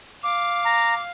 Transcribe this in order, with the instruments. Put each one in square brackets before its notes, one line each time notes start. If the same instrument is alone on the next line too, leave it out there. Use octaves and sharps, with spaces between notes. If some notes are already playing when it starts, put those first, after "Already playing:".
[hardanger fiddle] F5 [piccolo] D6
[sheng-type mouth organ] A#5